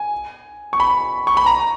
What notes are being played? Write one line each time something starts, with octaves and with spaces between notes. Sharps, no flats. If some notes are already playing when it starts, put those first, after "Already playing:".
Already playing: G#5
C#6
B5
C#6
B5
A#5